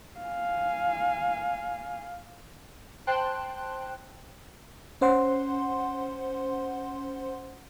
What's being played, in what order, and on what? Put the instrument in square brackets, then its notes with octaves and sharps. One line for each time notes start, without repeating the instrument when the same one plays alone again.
[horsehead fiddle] F5 G#5
[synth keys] C5 G5 A5 C6 F#6
[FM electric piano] C#4 C5 F#5 C6